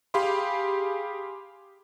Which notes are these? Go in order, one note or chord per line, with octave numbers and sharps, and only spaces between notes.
G4 G#4 F5 B5 C6